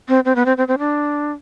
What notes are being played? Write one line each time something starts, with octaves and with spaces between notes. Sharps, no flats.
C4
C4
B3
C4
C4
C4
D4